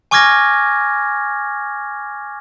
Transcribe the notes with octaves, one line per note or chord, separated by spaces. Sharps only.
G#5 C#6 D6 F6 G#6 A#6